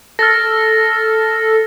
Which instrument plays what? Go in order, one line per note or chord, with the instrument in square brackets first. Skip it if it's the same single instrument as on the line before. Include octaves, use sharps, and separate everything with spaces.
[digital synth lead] A4 [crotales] F6 A6 A#6